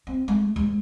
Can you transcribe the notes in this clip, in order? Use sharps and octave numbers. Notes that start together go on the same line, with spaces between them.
C4
G#3 A3
D#2 G#3